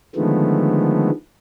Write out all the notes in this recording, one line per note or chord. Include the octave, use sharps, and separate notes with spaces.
D3 D#3 F3 G#3 A3 B3